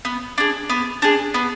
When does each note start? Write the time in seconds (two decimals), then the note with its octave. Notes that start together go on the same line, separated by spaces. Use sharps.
0.05 B3
0.38 D4 G#4
0.70 B3
1.02 D4 G#4
1.34 B3